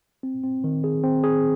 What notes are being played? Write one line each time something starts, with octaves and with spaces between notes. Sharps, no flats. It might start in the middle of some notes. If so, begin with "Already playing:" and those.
C4
C4
D#3
G#4
C4
G#4